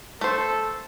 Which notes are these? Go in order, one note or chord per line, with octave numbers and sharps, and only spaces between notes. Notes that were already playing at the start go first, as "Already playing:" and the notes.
A3 A4 C5